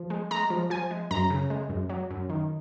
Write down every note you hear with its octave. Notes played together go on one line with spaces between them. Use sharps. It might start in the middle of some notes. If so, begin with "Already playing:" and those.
Already playing: F3
G#3
G#3 A#5
F3
F3 G#5
G#3
F#2 A#5
C#3
G#3
F#2
F#3
F#2
D#3